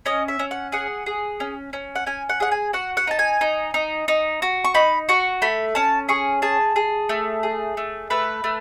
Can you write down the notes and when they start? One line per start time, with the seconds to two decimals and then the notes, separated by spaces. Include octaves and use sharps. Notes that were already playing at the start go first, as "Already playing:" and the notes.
0.06 C#4 D#5
0.28 E5
0.39 C#4
0.51 F#5
0.72 G#4 F#5
1.06 G#4
1.40 C#4
1.73 C#4
1.95 F#5
2.07 C#4 G#5
2.29 F#5
2.40 G#4 F#5
2.52 G#5
2.73 F#4 F#5
2.97 F#5
3.07 D#4 A5
3.19 G#5
3.41 D#4
3.74 D#4
4.08 D#4
4.42 F#4
4.65 C#6
4.74 D#4 B5
5.09 F#4 C#6
5.42 A3 B5
5.75 C#4 A5
6.09 G#4 C#6
6.42 G#4 A5
6.76 G#4
7.09 A3
7.43 G#4
7.77 A3
8.10 A3 B4
8.44 A3